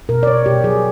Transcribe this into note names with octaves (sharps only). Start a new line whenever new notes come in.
B2 A#4
D5
B2 C#5
B2 G4
F#3 G#4